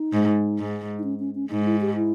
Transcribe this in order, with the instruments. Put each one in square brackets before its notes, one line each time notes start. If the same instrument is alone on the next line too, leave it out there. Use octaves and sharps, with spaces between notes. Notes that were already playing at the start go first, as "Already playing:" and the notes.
Already playing: [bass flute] D#4
[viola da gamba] G#2
G#2
[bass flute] D#4
C#4
C#4
C#4
[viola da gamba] G#2 [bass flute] D#4
[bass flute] E4
G4
E4